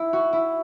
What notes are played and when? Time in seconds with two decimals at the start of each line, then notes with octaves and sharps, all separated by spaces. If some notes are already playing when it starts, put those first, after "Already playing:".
Already playing: E4
0.13 F#4
0.33 E4